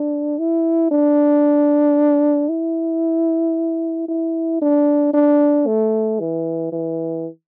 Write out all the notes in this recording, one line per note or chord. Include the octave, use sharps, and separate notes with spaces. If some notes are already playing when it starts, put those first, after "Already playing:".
Already playing: D4
E4
D4
E4
E4
D4
D4
A3
E3
E3